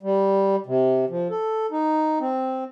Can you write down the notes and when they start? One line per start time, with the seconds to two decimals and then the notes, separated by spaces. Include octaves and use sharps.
0.03 G3
0.66 C3
1.10 F3
1.30 A4
1.71 D#4
2.21 C4